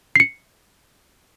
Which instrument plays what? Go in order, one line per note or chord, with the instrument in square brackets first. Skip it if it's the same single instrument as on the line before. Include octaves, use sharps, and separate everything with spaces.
[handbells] C7 C#7